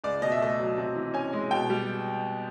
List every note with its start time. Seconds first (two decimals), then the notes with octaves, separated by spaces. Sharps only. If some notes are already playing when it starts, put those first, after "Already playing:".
0.04 C#2 D5
0.22 B2 D#5
0.32 E5
0.41 A3 D#5
0.59 F#3
0.78 C3
0.96 E3
1.14 C#4 G#5
1.33 G#3
1.51 B2 G5
1.70 G3